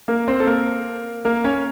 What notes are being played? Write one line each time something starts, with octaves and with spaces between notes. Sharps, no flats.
A#3 A#4
C4 C5
A4
A#3 A#4
A#3 A#4
C#4 C#5